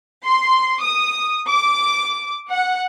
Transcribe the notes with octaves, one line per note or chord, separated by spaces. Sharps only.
C6
D#6
D6
F#5